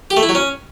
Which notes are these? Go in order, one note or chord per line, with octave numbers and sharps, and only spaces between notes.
G4
A3
E4
F#3
C#4